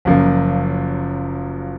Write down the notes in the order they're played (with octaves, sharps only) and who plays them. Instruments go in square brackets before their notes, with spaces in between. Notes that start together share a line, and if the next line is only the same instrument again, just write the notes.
[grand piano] F#1 F#2 F3 A#3